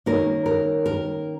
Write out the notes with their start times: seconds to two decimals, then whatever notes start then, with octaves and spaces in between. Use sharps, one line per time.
0.06 D#3 A#3 C#4 A#4
0.46 A#4
0.86 A#4